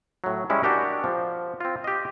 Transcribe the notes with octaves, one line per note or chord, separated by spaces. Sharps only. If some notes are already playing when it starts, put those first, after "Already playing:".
A2 F#3
G3 G#3 C#4 E4
D4 F#4 G4 A#4
F3
C4 F4
G4 D#5